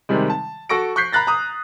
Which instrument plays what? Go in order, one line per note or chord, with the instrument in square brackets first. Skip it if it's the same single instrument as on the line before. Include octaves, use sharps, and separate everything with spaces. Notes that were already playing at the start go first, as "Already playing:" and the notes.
[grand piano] C3 D#3 G3 G#3
A5
F#4 A4 C#6 A#6 D7
C#6 F#6 G6 B6 C7
A#5 B5 F#6 A6 A#6
A#5 D#6